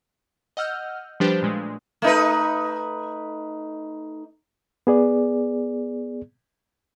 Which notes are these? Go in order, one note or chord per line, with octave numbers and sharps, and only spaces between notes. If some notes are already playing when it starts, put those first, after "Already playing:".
D#5 F#5 E6 F6 G6
F3 G3 D4 G4 B4 C5
A#2 G#3 A3
A3 D#4 B4
B3 G#4 D5